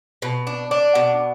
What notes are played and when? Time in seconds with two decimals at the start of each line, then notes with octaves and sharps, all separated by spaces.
0.22 B2
0.47 D4
0.71 D4
0.95 B2